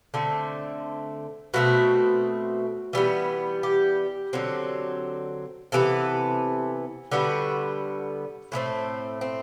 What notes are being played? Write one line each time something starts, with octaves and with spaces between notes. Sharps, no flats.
D3 A3 C4
B2 A3 C4 F#4
E3 G3 B3
G4
D3 F#3 C4
C3 E3 B3 A4
D3 G3 B3 F#4
A2 E3 A3 C4
C4